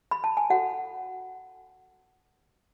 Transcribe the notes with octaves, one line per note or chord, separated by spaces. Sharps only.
B5
A5
G#5
F#4 A4 C#5 F#5